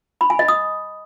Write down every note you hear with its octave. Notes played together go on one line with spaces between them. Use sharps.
B5
G#5
D#5
D#6